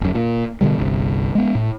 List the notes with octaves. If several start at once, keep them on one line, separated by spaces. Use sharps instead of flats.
G1 F#2
A#2
B2 D3 E3 G3
G1 C2
G#3 B3
A2